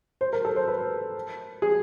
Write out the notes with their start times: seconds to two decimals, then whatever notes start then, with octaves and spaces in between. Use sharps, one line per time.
0.21 C5
0.33 A#4
0.45 A4
0.56 C5
0.68 B4
1.62 G#4